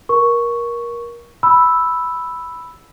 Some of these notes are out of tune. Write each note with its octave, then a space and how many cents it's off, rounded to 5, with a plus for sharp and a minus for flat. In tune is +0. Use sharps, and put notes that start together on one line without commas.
A#4 +20 C#6 +0
B5 +0 E6 +0